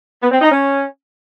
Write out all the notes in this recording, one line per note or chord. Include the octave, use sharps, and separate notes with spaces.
B3
C4
D#4
C#4